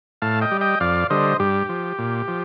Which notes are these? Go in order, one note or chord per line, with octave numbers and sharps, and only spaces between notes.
A2 F5 A5
D#5 G5
G3
D#5 G5
F2 D5 F5
D3 G3 C5 D#5
G2 G4
F3
A#2
F3